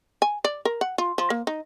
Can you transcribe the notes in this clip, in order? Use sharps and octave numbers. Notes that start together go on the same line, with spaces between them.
G#5
D5
A#4
F#5
F4
F3
A#3
D#4